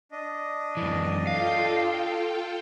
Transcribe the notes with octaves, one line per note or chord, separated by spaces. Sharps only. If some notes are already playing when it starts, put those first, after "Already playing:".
D4 D#5
F#2 E3
F4 A4 F5 G5